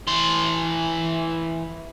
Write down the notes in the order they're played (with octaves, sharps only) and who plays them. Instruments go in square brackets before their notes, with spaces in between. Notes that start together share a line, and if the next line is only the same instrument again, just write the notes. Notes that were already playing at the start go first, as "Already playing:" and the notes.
[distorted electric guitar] E3 C6